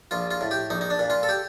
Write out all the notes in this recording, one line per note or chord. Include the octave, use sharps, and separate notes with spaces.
A#1 F4
F4
A2
G4
A#1 D#4
D#4
D4
A#2
F4
A4
G4